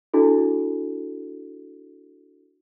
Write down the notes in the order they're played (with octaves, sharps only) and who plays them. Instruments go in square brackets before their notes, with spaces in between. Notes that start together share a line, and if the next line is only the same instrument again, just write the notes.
[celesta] D4 E4 F#4 A4